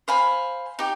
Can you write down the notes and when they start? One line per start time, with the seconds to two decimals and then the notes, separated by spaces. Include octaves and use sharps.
0.08 C5 F5 G#5 B5
0.79 D#4 G4